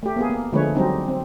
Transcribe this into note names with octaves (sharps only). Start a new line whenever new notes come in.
A3 G4
A#3 B3 G#4
A#3
D3 F3 G#3 A3 B4 C#5
F#3 G3 C4 D#4
C4